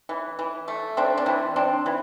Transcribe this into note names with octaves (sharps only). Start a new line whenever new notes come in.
E3
E3
A3
C4 D4
D4
E3 C4
C4 D4
E3